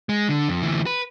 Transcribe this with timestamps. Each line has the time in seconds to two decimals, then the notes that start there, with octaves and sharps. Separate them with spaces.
0.09 G#3
0.29 D3
0.49 F2
0.62 D2 E3
0.86 B4